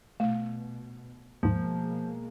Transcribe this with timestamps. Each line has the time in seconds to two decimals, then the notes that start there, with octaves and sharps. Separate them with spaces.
0.20 B2 A3
1.43 D#2 G#2 B2 F3 G#3 A#3